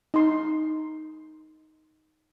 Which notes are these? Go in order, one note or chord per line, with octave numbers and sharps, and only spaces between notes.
D#4 C6